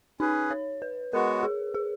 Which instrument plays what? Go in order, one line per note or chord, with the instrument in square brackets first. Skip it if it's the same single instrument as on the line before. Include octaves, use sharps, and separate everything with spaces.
[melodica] C#4 G#4 B4 [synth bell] D#4
[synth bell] C#5
B4
[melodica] G#3 B3 F#4 [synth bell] A#4
[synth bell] G#4
G#4